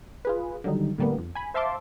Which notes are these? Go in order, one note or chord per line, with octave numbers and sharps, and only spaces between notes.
F4 G#4 B4
D3 D#3 F#3 G3 D#4
A2 D3 G3 A#3 B3
F2
G#5 B5
C5 E5 F5 A5 C6 D6